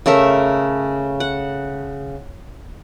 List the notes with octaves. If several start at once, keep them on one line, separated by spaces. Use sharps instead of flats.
C#3 A3 A#4 E5
F#5